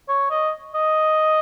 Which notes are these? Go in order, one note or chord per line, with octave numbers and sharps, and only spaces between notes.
C#5
D#5
D#5